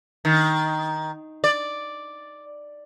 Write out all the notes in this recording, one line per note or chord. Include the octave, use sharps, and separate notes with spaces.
D#3
D5